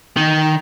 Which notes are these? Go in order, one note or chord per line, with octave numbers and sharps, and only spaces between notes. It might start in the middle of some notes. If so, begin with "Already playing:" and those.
D#3